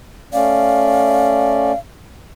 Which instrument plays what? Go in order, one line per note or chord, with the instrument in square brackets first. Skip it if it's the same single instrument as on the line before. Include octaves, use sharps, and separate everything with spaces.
[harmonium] A3 C#4 D5 [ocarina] F5